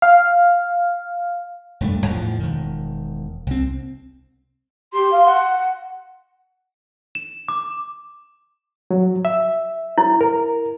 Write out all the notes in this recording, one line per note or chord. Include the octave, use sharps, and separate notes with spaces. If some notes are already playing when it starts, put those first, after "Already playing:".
F5
E1 G2 A3
E2 A2 F3
E1 D#3
C2 C4
G4 C6
F5
F#5
E7
D6
F#3
E5
E4
A#4